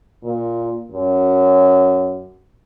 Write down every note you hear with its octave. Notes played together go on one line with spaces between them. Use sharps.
A#2
F#2